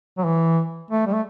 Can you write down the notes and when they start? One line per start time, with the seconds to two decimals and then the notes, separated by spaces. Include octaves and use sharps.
0.17 F#3
0.25 E3
0.90 A3
1.06 G3
1.14 A3